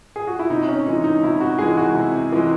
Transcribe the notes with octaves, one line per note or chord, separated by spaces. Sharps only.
G#4
F#4
E4
C3 D#4
C#4
E3 G#3 D#4
D#4
C3 E4
F#4
E3 G#3 G#4
F#4
C3
E3 G#3